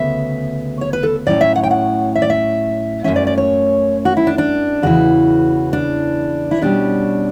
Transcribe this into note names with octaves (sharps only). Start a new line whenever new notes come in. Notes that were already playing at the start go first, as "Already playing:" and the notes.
Already playing: D2 C#3 B3 E5
C#5
B4
A4
A2 F#3 C#4 D5
E5
F#5
G5
F#5
E5
D5
E5
F#2 E3 A3 C#4 E5
D5
D5
C#5
F#4
E4
D4
D4
E2 C#3 E3 F#4
D4
E4
B2 G3 C#4 D4